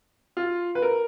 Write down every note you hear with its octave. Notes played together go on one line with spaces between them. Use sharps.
F4
B4
A#4